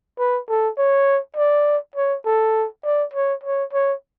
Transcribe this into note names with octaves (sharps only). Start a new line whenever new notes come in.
B4
A4
C#5
D5
C#5
A4
D5
C#5
C#5
C#5